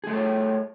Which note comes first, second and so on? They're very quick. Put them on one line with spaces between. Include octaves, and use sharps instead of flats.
G#4 A3 A4 C#5